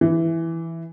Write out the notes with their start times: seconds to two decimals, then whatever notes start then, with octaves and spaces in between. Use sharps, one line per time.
0.01 E3